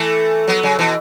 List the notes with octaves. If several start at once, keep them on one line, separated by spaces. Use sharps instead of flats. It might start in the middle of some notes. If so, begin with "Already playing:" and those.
Already playing: E3 A3
F#3 B3
C#3 F#3
B2 E3